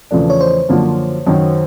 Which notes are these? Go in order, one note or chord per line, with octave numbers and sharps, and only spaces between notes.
E2 C#3 F3 A3 D4
C#5
C5
F#2 D3 F3 A#3
F#2 D#3 F#3